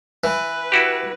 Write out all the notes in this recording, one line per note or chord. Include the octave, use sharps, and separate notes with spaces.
E3 B4
E4 F#4 G4